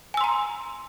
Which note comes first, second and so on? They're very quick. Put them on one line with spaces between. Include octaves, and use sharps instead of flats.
G#5 E6 C6 A#5